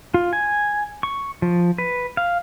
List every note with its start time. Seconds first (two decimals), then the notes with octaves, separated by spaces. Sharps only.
0.14 F4
0.33 G#5
1.03 C#6
1.42 F3
1.78 B4
2.17 F5